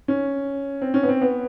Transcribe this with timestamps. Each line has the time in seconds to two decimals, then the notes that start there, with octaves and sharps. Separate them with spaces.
0.08 C#4
0.81 C4
0.94 C#4
1.03 B3
1.09 C4
1.21 B3